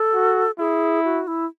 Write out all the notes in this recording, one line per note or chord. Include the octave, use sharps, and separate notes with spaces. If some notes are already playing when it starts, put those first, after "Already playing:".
Already playing: A4
F#4
E4 G#4
F#4
E4